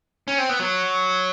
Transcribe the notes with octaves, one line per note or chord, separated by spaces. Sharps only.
C#4
C4
B3
F#3